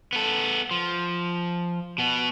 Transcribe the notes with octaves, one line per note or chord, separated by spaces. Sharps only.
B3 A4
F3
B2 B3